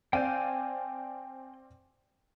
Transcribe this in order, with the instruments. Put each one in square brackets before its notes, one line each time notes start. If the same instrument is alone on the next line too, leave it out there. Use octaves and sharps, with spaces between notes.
[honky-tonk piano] C4 D5 F5 [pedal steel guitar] G5 G#5 G6